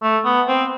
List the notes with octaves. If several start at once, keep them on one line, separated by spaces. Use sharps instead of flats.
A3
B3
C4